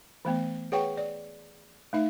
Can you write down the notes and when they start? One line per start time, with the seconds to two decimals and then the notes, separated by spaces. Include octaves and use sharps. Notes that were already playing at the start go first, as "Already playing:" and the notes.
0.25 E3 A3 B3
0.72 G#4 B4 C#5 F#5 G5 C#6
0.97 D5
1.93 A3 D#4 E5